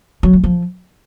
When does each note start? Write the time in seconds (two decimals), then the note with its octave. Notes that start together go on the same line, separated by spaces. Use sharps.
0.23 F#3
0.33 A3
0.44 F3